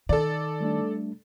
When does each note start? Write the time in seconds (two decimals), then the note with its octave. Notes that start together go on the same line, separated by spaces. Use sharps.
0.09 D#3 A4 D5
0.61 G3 A3 D4